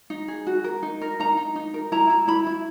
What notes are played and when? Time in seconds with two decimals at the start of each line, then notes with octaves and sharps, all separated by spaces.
0.10 D#4
0.28 G#4
0.47 F#4
0.64 A#4
0.83 D#4
1.01 A#4
1.20 D#4 A#5
1.37 D#4
1.56 D#4
1.74 A#4
1.92 E4 A#5
2.10 E4
2.28 E4 B5
2.47 E4